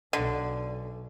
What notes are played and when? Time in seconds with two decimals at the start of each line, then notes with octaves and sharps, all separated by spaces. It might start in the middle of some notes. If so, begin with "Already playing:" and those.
0.13 B1 D3